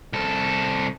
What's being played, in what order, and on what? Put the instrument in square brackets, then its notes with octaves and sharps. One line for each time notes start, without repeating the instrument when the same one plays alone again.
[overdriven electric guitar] C2 A4